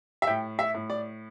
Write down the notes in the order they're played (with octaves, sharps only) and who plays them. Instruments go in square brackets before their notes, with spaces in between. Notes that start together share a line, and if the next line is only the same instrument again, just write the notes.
[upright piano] E5
A2 G5
E5
A2
D5